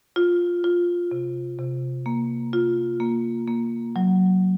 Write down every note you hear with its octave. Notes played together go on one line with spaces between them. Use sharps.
F4
F4
C3
C3
A#3
F4
A#3
A#3
F#3